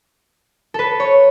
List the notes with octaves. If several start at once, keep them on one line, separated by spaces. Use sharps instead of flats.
A4 B4
C#5